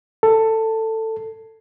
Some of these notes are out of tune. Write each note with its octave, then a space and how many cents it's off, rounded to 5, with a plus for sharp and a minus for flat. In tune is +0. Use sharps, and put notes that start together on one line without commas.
A4 +15